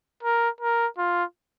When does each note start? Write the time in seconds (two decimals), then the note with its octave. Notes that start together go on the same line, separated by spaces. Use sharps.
0.23 A#4
0.61 A#4
0.98 F4